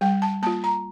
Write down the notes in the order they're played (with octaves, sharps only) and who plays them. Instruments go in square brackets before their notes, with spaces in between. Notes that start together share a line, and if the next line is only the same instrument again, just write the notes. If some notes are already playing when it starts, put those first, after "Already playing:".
[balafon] G3 G5
A5
A#3 F4 A5
A#5